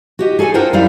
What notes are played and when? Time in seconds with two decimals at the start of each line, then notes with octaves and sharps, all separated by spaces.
0.19 F#4 G4 D#5
0.39 G#4 A4 C#5 F5 G#5
0.54 D4 F4 A#4 C5 F#5 G5
0.73 F#2 G3 D#4 E4 D5 F5